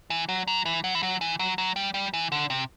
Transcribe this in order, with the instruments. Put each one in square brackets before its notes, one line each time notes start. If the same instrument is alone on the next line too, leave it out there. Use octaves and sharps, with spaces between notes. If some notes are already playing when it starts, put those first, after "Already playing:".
[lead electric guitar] E3
F#3
F#3
E3
F#3
E3
F#3
E3
F#3
F#3
G3
G3
E3
D3
C3